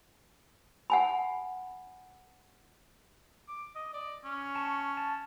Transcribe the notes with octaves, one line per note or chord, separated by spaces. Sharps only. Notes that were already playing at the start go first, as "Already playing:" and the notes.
F#5 G#5 B5
D6
D#5
D5
C#4
A5 C#6
A5